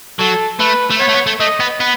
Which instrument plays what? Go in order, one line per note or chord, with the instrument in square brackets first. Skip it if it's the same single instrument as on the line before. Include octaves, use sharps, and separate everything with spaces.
[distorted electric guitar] F#3 [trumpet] A4
[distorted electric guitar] A3 [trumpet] B4
[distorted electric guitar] A3
[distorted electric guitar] B3 [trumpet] C#5
[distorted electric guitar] A3
B3
A3
[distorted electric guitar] A3 [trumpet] D#5
[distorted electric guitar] B3
B3